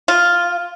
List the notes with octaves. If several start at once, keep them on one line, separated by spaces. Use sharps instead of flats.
F4